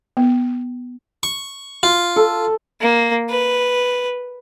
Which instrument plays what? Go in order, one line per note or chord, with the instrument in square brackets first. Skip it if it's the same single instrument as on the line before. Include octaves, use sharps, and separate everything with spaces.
[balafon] B3
[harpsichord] C#6
F4
[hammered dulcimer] A4
[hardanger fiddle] A#3
B4